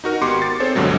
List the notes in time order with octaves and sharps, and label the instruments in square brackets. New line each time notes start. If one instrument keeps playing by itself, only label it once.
[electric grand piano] D#4 F#4 A#4
G#1 B3 G4 C6 D6 C#7
A6
C4 G#4 A4 C5 C#5
B1 G2 B2 D3 F#3 G#3